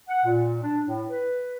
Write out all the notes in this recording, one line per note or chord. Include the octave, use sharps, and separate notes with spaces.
F#5
A#2
D4
A2
B4